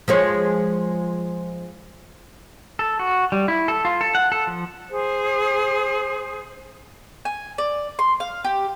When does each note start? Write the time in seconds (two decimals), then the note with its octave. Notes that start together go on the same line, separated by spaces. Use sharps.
0.08 F3 G#3 C#5
2.79 A4
2.99 F#4
3.32 G3
3.48 E4
3.68 A4
3.85 F4
4.01 A4
4.15 F#5
4.32 A4
4.47 F3
4.91 G#4 C5
7.25 G#5
7.58 D5
7.99 C6
8.20 F5
8.44 G4